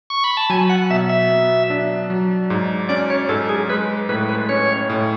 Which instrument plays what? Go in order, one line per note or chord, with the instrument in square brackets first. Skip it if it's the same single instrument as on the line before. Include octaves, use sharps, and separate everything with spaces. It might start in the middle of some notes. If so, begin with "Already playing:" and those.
[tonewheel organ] C#6
B5
A5
[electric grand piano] F#3 [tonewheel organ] G#5
[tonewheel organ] F#5
[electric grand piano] B2 [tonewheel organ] E5
[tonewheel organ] E5
[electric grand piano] B3
D4
F#3
G#2
[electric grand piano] C#4 [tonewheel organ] D5
[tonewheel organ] C#5
[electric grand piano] G#2 [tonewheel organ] A4
[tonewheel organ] G#4
[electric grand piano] G#3 [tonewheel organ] B4
[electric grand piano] A2 [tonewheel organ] B4
[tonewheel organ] B4
[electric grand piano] C#4 [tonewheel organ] C#5
[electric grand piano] A2